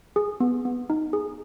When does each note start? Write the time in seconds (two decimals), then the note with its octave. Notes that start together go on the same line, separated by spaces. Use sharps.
0.16 G#4
0.40 B3
0.65 B3
0.90 D#4
1.13 G#4